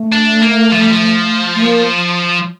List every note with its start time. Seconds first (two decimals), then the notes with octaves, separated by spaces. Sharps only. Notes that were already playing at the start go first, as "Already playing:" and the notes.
Already playing: A3
0.12 D4
0.42 A#3
0.72 F3
0.81 G3
0.91 F3
1.55 A3
1.62 A#3